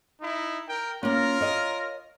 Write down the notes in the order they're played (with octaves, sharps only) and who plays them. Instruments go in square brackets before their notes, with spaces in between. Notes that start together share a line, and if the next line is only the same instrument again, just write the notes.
[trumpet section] D#4 E4
A#4 G5
[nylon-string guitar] A#3 C#4 [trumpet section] F4 A#4
[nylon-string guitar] C#5 D#5 F5